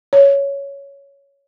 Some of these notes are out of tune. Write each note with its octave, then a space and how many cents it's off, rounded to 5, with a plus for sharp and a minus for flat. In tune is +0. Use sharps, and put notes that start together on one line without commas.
C#5 +5